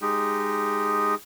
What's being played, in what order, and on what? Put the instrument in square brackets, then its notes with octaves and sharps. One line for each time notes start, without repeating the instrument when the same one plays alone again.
[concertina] G#3 D#4 G4